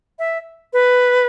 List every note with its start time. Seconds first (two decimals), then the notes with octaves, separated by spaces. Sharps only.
0.19 E5
0.73 B4